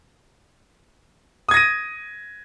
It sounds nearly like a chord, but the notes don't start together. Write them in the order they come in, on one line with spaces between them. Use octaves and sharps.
D#6 G#6 A#6 D#7